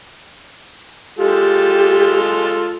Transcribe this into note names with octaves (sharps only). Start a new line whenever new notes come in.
G#3 F4 G4 A4